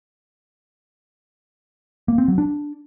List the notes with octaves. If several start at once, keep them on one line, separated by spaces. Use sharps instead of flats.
A#3
C4
F#3
D4